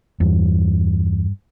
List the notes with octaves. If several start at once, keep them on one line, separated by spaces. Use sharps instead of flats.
E2 G2